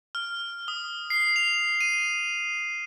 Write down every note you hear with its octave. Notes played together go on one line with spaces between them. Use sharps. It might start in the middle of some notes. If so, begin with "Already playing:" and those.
F6
D#6
C7
F7
D#7